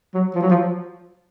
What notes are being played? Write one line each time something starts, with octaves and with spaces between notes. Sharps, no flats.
F#3
F3
F#3
F3